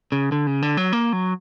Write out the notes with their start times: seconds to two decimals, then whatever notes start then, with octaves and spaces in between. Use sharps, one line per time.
0.12 C#3
0.32 D3
0.47 C#3
0.62 D3
0.77 F#3
0.93 A#3
1.13 F#3